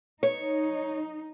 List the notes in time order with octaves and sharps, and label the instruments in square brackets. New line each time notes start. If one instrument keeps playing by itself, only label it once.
[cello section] D#4 [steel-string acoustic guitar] C#5